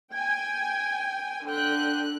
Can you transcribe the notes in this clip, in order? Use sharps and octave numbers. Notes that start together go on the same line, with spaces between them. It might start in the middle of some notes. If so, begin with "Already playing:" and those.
G5 G#5 G#6
D3 G5 F#6